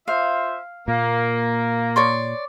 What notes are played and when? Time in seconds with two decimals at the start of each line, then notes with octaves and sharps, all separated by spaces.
0.08 F4 C5 E5 F5
0.88 A#2 A#3
1.96 C#5 D5 C6